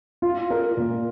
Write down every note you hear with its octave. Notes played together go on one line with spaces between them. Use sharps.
F4
A#4
A#2